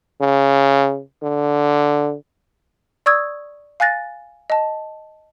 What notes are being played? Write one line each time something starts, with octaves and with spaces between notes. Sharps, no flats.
C#3
D3
D5 C#6 D#6 E6 G#6
F5 G#5 F#6 A6 A#6
D#5 A5